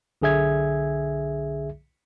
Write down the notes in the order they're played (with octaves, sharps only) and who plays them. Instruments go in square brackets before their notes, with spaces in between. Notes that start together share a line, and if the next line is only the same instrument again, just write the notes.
[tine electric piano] B1 D3 G#4 E5 G#6